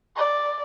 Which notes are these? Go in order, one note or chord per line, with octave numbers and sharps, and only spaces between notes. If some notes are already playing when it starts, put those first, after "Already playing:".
D5